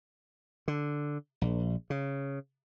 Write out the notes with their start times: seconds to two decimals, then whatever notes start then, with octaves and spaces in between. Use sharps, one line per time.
0.68 D3
1.41 A#1
1.90 C#3